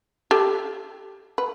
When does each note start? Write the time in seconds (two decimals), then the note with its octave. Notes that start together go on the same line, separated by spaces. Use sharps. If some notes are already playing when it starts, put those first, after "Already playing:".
0.31 G4 A4
1.38 B4